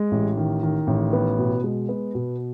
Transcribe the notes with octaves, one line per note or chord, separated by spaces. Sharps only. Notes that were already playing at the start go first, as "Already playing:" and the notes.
Already playing: G#3
A1
D#3
D#3
A1
B3
B2
G#3
B3
B2